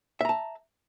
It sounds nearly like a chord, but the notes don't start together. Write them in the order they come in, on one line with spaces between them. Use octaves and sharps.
E5 A#5 A5